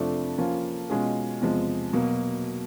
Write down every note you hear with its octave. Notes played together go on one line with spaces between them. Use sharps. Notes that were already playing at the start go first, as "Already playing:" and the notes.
Already playing: F2 C3 F3 A3 D4
F3 A#3 C#4 F4
B2 G#3 C#4 F4 G#4
E2 C3 F3 G#3
B2 F#3 A#3